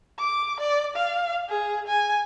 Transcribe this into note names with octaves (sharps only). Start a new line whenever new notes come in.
D6
D5
F5
G#4
G#5